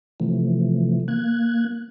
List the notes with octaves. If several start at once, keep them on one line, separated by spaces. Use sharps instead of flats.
C3 E3 F3 A3
A#3 F#6 G#6